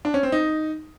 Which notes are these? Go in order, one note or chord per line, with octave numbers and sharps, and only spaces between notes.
D4
C#4
C4
D#4